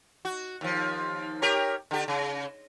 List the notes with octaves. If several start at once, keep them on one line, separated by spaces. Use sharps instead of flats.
F#4
D#2 F3
G4 A#4 C#5
D3 G4
C#3